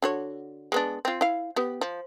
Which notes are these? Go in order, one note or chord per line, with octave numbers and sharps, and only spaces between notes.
D3 F#4 C#5
G#3 B3 D4
C4 F4
E4 F5
B3 G4
F3